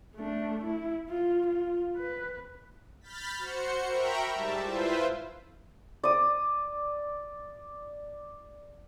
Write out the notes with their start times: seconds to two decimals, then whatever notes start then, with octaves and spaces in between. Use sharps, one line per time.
0.16 A3 D4
0.64 E4
1.09 F4
1.46 F4
1.97 B4
3.01 B5 F6 G6 A6 B6
3.38 F#4 C5 C#7
3.87 A#4 E5 G5 A#5 B5 C#6
4.32 G#2 G3 E5 A5
4.63 E4 F4 B4 C5 E5
6.03 D5 D#6